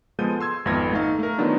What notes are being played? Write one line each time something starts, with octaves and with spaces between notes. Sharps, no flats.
F3 G#3 B3 A4 G6 D#7
C6 E6 G#6
G#1 F2 B3 F4 G#6 A#6
A3 D#4 F5
A3 A#4
D#3 F#3 B3 D4 D#4 F4